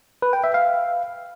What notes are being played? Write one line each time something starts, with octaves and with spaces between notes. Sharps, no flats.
B4
G5
E5
F5